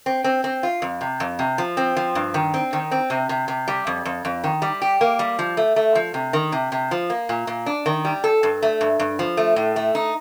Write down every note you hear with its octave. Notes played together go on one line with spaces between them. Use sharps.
C4
C4
C4
F4
F2
C3
F2
C3
F3
C4
F3
G2
D#3
C4
D#3
C4
C3
C3
C3
G3
F2
F2
F2
D#3
G3
G4
A#3
G3
F3
A3
A3
F3
C3
D#3
C3
C3
F3
A#3
A#2
A#2
D4
D#3
G3
A4
G2
A3
G2
G2
F3
A3
A2
A3
D#4